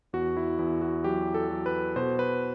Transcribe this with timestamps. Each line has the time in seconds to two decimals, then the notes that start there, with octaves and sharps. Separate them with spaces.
0.13 E2 F#4
0.37 E4
0.59 E2 E4
0.81 F#4
1.04 F#3 G4
1.34 A4
1.50 F#3
1.66 B4
1.96 B2 C5
2.19 B4